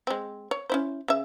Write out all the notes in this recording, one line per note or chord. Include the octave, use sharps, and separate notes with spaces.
G#3 C4
C#5
C#4 E4 C5
C#3 E5